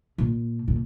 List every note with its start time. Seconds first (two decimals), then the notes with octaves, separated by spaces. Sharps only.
0.18 A#2
0.68 A#2